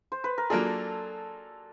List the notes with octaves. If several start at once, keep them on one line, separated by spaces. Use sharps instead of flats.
C5
B4
A#4
F#3 A#3 D4 F4 G#4 A4